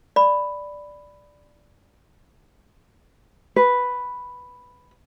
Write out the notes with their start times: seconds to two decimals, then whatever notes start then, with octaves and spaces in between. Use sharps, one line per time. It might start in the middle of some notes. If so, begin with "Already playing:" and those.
0.16 D5 B5
3.56 B4